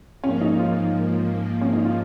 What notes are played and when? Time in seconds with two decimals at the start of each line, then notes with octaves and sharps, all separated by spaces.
0.23 G#2 F3 A#3 C#4
0.41 D#4
0.59 F4
1.62 C#4
1.73 D#4
1.85 F4